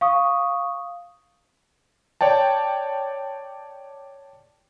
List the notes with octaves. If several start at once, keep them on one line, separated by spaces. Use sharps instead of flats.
F5 C#6 D#6
C#5 D5 G5 A5